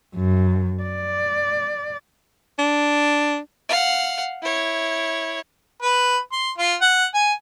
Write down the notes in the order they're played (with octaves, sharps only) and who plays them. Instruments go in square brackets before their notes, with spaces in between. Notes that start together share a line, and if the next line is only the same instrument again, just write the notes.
[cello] F#2
D5
[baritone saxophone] D4
[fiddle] F5 F#5
E4 C#5
[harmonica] B4
C6
F4
F#5
G#5